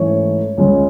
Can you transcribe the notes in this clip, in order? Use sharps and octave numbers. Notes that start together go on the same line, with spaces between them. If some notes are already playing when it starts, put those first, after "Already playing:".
Already playing: G#2 E3 A3 C#4 C#5
C#2 C#3 G#3 C#4